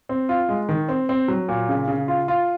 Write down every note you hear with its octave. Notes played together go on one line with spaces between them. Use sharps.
C4
F4
G#3
D#3
C4
C4
F#3
A#2
C#3
C#3
F4
F4